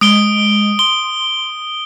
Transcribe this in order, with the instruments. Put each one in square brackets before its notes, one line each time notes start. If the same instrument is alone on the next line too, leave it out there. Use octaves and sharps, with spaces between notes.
[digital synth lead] G#3 [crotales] D#6 D7 G7
[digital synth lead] C6 [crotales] G7